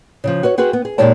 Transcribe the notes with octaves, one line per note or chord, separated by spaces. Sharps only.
C#3 E3 F3
F#4 B4 C#5
C4 F#4 G#4 B4 C5
B3
G#4
A#2 G#3 D#4 G4 C#5 A5